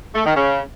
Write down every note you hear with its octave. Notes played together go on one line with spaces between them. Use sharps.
A3
D#3
C#3